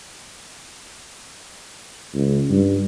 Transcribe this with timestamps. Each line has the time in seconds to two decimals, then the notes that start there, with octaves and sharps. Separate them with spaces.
2.14 C#2
2.50 G2